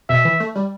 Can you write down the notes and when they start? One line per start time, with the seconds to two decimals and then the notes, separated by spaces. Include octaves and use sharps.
0.09 B2 E5
0.25 E3
0.40 A3
0.56 G3